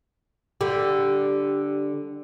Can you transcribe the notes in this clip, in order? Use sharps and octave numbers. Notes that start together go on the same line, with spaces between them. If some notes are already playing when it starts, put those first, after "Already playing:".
D3 G3 G4